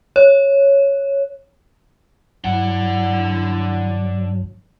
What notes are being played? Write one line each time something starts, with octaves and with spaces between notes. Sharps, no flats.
C#5
G2 F#3 D4 E4 F#5